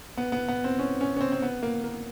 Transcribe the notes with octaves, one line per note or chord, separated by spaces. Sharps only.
B3
B3
B3
C4
C#4
C#4
C#4
C4
C4
B3
A#3
A#3